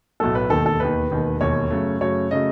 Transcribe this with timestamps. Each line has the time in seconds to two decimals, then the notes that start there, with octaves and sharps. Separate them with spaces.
0.20 B1 A2 F#3 A3 A4
0.35 B4
0.50 E1 D#2 D#3 A4
0.66 A4
0.80 E1 D#2 D#3 B4
1.10 E1 D#2 D#3
1.41 E1 D#2 D#3 C#5
1.71 F#2 C#3 F#3 A3
2.01 F#2 C#3 F#3 A3 C#5
2.31 C#3 F#3 A3 D#5